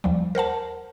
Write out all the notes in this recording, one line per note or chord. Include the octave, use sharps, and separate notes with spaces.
D#2 F3 G3
A#4 C5 F#5 A5